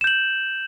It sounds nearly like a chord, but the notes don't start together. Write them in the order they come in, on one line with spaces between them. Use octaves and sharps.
E7 G6 F#7